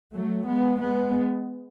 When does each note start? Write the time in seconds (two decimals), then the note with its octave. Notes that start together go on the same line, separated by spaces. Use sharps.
0.13 F#3 A3
0.47 G#3 B3
0.80 G#3 B3